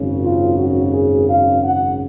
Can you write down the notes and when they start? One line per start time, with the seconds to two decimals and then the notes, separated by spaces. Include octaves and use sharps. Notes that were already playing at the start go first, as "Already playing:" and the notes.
Already playing: G#1 F#2 C#3
0.21 F4
0.57 F#4
0.92 G#4
1.27 F5
1.62 F#5